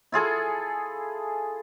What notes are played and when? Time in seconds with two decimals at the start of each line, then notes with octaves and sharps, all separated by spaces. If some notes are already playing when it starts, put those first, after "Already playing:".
0.12 E4 F4 G#4 A4